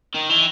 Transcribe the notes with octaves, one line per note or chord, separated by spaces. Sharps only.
D#3
E3